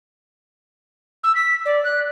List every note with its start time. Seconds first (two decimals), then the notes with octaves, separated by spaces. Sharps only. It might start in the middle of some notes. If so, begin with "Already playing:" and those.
1.24 E6
1.35 B6
1.65 D5
1.84 F#6